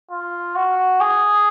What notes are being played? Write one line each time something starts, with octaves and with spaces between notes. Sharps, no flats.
F4
F#4
G#4